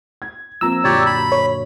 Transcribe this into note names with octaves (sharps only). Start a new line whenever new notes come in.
G#6
F3 A#3 C4 A#5 E6
F#2 A#2 D3 G4 C#5 D5
B5
C#5